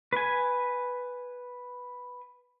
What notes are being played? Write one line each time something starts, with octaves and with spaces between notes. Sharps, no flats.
B4 G#5